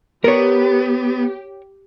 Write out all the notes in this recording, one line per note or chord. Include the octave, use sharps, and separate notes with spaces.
B3 G4 A#4 C#5